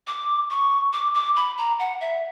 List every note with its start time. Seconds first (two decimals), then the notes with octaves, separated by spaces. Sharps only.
0.07 D6
0.50 C#6
0.93 D6
1.14 D6
1.36 B5
1.58 A#5
1.79 F#5
2.01 E5